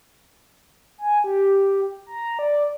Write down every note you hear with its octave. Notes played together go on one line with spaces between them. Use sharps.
G#5
G4
A#5
D5